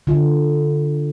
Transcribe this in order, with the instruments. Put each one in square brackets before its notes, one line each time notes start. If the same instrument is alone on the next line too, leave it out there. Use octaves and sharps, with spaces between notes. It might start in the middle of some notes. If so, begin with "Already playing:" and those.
[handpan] D3 F4